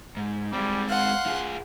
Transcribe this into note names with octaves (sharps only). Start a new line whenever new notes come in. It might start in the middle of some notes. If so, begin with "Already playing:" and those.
G#2
G3 G#3 C4
F5 F#5 C6
F4 G#4